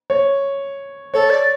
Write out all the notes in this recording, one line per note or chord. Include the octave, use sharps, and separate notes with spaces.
C#5
A4 C#5
D5